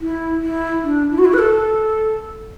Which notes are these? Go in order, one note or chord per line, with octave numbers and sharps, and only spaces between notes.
E4
E4
D4
E4
F#4
E4
B4
A4